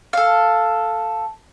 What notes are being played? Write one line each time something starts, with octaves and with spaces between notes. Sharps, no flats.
A4 F5